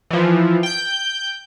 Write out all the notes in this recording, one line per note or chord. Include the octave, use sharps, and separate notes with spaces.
E3 F3
G5 G6